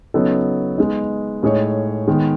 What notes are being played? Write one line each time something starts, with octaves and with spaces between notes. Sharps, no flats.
C#3 F#3 B3 D#4 A4
G#3 B3 D#4
A2 G#3 D#4 G#4 C#5
D#3 G#3 B3